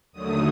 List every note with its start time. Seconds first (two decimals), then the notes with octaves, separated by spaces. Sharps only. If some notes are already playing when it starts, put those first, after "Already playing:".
0.12 D#2 D3 F#3 A3 D#6